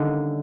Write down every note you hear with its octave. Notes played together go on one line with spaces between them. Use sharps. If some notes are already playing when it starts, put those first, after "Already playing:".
Already playing: D3 D#3 G3 A#3 C#4